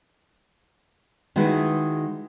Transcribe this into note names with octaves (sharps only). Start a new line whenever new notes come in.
D#3 G#3 E4 F#4 B4